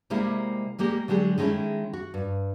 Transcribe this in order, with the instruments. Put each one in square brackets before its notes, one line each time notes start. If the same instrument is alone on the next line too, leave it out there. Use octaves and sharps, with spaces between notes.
[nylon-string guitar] C3 G3 G#3 A#3 E4
G3 G#3 A#3 G4
D3 F#3 G#3 G4 G#4
D#3 G#3 A3 C#4 E4
F#4
G2